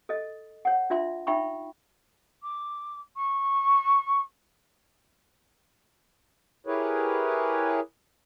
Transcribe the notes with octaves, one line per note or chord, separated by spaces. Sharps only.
A4 D#5
C#5 F#5
D4 F4 E5 C6
D#4 E5 G5 B5 C#6
D6
C#6
E4 G4 G#4 A#4 B4 C#5